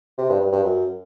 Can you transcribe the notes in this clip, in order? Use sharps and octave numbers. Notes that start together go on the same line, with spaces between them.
C3
G2
G2
G2
F#2